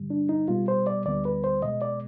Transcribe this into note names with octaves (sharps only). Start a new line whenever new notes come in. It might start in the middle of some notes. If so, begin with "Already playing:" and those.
Already playing: G2 D3 G3
D4
D#4
B2 G3 B3 F4
C5
D5
D2 D3 G3 B3 D5
B4
C5
B2 G#3 B3 D#5
D5